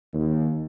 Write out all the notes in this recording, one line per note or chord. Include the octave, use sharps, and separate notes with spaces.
D#2